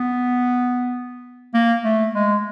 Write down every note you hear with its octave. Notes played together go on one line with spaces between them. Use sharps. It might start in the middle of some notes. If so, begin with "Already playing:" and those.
Already playing: B3
A#3
A3
G#3